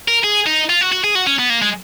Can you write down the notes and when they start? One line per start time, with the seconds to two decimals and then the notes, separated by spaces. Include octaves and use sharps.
0.08 A#4
0.24 G#4
0.46 D#4
0.69 F4
0.81 F#4
0.92 F#4
1.04 G#4
1.15 F#4
1.27 C#4
1.39 B3
1.50 A#3
1.62 G#3